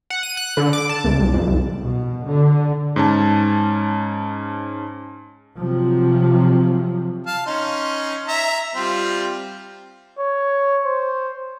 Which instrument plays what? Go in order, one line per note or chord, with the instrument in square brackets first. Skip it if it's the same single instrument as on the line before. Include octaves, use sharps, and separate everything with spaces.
[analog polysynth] F#5
D#7
F#6
D3
D6
A5
C#2
C2
F2
C2
[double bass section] B2
D3
[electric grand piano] G#2 C#4 A5
[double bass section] C3 F3 F#3
[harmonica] F5 A5
C#4 D#4 C6
E5 A#5
G3 C4 F4
[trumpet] C#5
C5